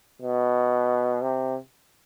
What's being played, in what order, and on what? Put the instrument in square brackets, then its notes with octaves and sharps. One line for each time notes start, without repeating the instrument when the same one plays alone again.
[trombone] B2
C3